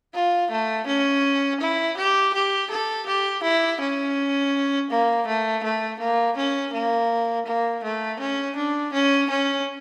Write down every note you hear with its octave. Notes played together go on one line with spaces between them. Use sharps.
F4
A3
C#4
E4
G4
G4
A4
G4
E4
C#4
A#3
A3
A3
A#3
C#4
A#3
A#3
A3
C#4
D4
C#4
C#4